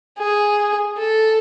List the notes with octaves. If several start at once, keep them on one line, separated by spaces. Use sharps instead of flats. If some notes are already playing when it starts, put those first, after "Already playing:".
G#4
A4